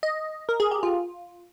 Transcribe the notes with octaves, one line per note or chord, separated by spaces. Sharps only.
D#5
A#4
G#4
G4
F4